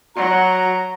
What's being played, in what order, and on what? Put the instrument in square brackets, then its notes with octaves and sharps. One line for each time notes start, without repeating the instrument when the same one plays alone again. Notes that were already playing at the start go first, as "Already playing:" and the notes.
[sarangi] F#3 [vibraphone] F#4 [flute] A#5